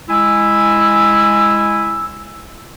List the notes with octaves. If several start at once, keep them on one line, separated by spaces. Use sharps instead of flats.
G#3 E4 G#5 E6